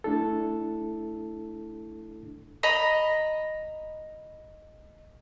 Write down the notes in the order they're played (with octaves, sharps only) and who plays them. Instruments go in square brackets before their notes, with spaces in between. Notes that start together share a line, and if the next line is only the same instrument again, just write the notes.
[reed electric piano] A3 D4 E4 A4
[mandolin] D#5 A#5 B5